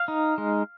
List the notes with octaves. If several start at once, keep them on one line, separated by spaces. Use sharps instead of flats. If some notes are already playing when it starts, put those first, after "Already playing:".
Already playing: F5
D#4
G#3